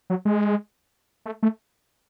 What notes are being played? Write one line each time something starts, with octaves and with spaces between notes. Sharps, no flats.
F#3
G#3
A3
A3